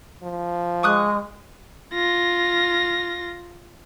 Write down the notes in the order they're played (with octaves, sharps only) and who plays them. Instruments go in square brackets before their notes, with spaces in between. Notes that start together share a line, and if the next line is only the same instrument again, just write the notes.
[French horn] F3
[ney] G#3 [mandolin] C#6 D#6 F#6
[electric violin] F4 A#6